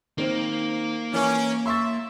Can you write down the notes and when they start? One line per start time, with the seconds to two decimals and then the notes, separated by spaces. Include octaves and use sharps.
0.18 D#3 A#3 C4
1.13 E3 C#4 A#4 G#5
1.66 E5 C6 C#6 A6